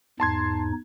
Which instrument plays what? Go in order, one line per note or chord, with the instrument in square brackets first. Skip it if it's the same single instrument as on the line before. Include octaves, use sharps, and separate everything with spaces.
[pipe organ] E2 G#2 D#4 [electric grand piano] A5 C6 G#6